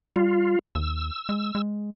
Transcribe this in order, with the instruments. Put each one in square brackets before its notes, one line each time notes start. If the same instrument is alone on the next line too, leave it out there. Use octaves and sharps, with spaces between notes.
[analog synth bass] G3 [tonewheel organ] F4
[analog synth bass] D#2 [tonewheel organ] E6
[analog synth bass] G#3
G#3